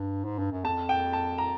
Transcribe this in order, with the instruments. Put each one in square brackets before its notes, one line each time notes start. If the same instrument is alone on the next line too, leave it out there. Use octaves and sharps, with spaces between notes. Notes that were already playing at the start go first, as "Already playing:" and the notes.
Already playing: [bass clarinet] G2
G#2
G2
F#2
[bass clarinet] F2 [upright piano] A5
[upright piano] G5
A5
A#5